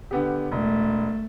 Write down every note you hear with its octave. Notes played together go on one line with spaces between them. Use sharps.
D3 B3 G4
E1 A3